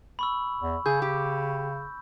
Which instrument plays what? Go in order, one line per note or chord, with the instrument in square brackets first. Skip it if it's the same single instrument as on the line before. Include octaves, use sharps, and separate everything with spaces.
[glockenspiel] B5 C#6 E6
[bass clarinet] E2
[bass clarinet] C#3 [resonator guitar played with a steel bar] G#4 [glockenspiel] G6
[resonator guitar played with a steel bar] G4